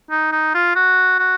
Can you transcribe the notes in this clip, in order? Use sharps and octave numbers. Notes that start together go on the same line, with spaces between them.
D#4
D#4
F4
F#4
F#4